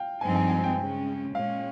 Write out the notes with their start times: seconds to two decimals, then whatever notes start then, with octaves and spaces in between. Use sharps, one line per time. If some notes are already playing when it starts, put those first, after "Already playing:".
Already playing: F5 G5
0.21 G2 F3 G#3 C4 D#4 G#5
0.35 G#5
0.49 G#5
0.64 G5
0.78 C#3 G#3 C#4
1.35 A#2 G#3 C#4 F5